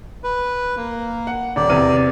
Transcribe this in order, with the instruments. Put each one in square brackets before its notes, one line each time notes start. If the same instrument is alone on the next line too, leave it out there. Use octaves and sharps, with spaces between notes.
[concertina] B4
A#3
[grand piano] F#5
[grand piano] D#1 [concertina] D5
[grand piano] E2 C3 D#7